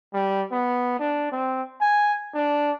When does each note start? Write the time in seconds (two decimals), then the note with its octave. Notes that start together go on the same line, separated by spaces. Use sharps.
0.14 G3
0.52 B3
0.99 D4
1.32 C4
1.82 G#5
2.34 D4